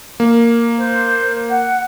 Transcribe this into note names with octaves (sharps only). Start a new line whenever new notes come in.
A#3
C5
F#5